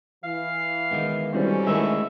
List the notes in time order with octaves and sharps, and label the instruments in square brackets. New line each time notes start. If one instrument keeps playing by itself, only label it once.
[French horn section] E3 [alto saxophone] F5
[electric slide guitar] D#3 G#3 B3
[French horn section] D2 C3 C#4 [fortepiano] E3 G3 C4
[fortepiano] D#3 E3 A3 [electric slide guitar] G#3 E4 [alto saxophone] E5